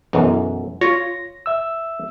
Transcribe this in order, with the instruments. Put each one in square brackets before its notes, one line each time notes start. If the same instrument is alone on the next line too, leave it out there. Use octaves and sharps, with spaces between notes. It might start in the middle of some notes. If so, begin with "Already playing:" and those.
[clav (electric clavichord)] B1 F#2 [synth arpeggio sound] E3
[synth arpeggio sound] F4 [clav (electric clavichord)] C#5 [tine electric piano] A#6
[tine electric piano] E5 E6